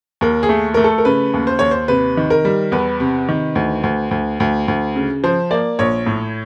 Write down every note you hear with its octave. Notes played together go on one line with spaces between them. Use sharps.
D#2 A#4
G#4
A3
A3 A#4
A4
A#4
C#3 B4
D#2
C5
D#2 C#5
C5
C3 B4
D#3
A#4
G3
E2 B4
C3
D#3
D2
D2
D2
D2
D2
C#3
F3 C5
A#3 D5
A#1 C#5
A2